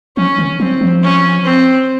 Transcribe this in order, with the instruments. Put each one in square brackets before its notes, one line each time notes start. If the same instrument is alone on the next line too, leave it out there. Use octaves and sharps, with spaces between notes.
[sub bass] F3 [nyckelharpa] C#4
[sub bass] D#3
[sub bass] F#3 [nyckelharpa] C4
[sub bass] F3
[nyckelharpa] C#4
C4